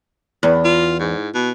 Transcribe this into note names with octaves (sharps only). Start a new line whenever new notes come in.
E2
F4
G#2
B2